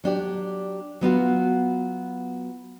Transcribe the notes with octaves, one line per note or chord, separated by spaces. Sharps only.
F#3 D4 G4 D5
F#3 B3 F4 F#4